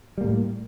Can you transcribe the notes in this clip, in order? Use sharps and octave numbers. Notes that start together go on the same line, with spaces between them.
A2 G3 A#3